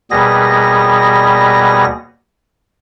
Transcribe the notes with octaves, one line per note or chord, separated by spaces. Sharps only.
D#2 B2 G3 B3 G#4 A#6